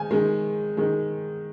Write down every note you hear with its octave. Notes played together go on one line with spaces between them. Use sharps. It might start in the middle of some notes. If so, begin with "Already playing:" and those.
Already playing: D#3 G#3 G#5
D#3 G#3
D#3 G#3